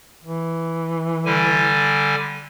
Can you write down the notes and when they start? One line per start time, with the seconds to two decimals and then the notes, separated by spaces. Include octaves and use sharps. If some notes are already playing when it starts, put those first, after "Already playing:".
0.24 E3
1.25 D3 G3 G#5